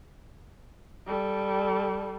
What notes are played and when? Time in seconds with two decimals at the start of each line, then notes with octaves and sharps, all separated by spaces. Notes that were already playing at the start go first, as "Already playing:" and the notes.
1.06 G3 A4